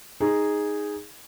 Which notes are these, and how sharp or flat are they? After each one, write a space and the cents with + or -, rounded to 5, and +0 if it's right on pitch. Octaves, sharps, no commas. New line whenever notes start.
D#4 +0 G#4 -5